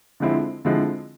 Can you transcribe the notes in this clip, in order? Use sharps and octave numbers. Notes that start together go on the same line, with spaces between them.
D3 F3 G#3 C4 E4
D3 F3 G#3 C4 E4